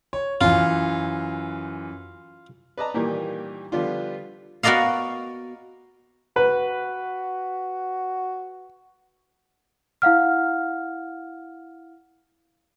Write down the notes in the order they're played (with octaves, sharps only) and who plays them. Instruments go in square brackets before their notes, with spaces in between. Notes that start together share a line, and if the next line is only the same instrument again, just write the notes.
[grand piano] C#5
[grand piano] F#2 E3 [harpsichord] F4
[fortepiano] B4 D5 D#5 A5 A#5
A#2 D#3 E3 G3 A#3 G4
D3 F3 G3 B3 D4 F4
[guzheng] B3 F#4 A#4 D5 D#5 F5
[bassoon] F#4 [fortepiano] B4
[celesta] E4 F5 F#5 F6